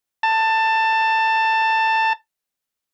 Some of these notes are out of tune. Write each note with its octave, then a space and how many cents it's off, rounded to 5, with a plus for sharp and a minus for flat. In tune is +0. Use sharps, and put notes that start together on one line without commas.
A5 +15